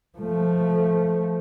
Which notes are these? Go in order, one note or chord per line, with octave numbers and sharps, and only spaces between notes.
F3 A3